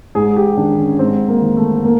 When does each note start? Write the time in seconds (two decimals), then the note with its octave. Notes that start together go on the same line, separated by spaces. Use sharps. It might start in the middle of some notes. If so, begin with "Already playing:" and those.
0.15 G#2 G#4
0.36 G4
0.57 D#3 D4
0.78 C#4
0.99 G#2 C4
1.28 A#3
1.41 D#3
1.56 A3
1.85 A#3